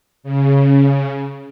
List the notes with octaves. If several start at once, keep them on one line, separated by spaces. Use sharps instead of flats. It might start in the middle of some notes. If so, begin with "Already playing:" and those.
C#3